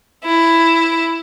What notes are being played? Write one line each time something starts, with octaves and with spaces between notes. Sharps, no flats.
E4